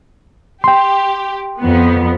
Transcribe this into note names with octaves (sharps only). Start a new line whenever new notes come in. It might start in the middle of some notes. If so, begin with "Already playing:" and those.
G4 G5 C6
F2 B3